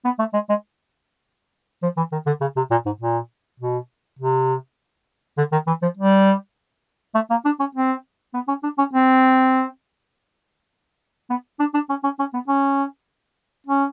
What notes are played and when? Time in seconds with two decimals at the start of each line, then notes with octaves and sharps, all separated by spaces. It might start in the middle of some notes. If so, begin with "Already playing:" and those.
0.05 B3
0.19 A3
0.33 G#3
0.49 G#3
1.83 F3
1.97 E3
2.12 D#3
2.26 D3
2.41 C#3
2.56 C3
2.71 A#2
2.86 G#2
3.00 A#2
3.60 B2
4.19 C3
5.38 D3
5.52 D#3
5.67 E3
5.82 F3
5.97 G3
7.15 A3
7.30 A#3
7.45 D4
7.60 C#4
7.75 C4
8.34 B3
8.48 C#4
8.63 D4
8.78 C#4
8.93 C4
11.30 B3
11.60 D4
11.74 D4
11.89 C#4
12.04 C#4
12.19 C#4
12.34 B3
12.48 C#4
13.67 C#4